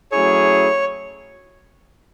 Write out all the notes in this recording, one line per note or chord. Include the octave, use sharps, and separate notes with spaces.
F#3 A3 C#4 E4 G#4 C#5